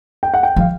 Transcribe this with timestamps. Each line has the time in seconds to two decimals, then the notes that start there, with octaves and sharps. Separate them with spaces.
0.23 G5
0.34 F#5
0.43 G5
0.56 F3
0.60 F5